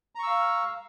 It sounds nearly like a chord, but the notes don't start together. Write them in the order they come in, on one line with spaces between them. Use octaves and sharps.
A#5 C#6 E6 F5